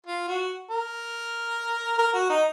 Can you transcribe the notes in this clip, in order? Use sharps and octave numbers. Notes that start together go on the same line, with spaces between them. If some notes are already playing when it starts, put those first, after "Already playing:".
F4
F#4
A#4
A#4
F#4
D#4